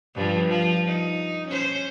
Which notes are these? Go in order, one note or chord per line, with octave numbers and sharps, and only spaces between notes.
G2 F3
F3 F4
D#4
C#4 C5